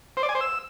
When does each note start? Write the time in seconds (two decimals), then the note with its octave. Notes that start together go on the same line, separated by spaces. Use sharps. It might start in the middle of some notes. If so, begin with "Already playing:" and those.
0.17 C5
0.23 D5
0.29 G#5
0.35 C5
0.41 E6